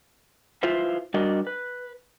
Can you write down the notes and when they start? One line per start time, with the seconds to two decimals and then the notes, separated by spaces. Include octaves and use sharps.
0.63 E4 F4 B4 C5 E5 F5
1.14 G3 D4 F#4 A#4 D5 D#5
1.47 B4